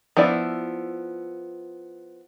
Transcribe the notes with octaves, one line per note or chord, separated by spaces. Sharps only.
F3 B3 E4 D5